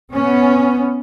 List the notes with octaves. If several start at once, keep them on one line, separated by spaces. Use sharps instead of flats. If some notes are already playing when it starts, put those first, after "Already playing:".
B3 C#4